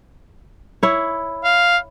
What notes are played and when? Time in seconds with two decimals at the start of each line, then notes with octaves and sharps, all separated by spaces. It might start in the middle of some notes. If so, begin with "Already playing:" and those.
0.83 E4 C#5
1.44 F5